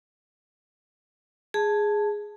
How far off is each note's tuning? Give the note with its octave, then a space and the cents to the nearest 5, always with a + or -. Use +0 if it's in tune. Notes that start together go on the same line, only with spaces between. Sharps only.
G#4 +0 A5 +0